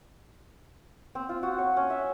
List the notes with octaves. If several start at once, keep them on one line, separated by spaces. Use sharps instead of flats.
C4
F4
F#4
C#5
C#4
E5